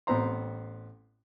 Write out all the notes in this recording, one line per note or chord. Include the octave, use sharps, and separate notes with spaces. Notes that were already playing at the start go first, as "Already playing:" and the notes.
A1 B3 C4 C5 A#5 C6